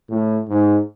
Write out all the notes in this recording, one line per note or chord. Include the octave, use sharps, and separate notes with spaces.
A2
G#2